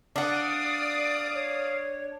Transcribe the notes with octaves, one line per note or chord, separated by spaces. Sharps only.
D4 D5 F5 F#5 D#6
C#5